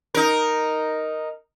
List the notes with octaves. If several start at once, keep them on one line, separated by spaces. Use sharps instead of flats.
D#4 A#4